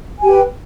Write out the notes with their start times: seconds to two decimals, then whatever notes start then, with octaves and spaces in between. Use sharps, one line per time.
0.20 G#5
0.23 G4
0.25 G5
0.28 B4